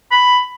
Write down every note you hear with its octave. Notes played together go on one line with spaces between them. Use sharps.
B5